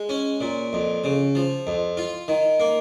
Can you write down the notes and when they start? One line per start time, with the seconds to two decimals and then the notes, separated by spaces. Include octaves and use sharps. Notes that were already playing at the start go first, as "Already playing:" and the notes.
Already playing: G#3
0.09 C#4
0.41 A#2
0.73 F2
1.04 C#3
1.35 F3
1.67 F2
1.97 F4
2.28 D#3
2.60 A#3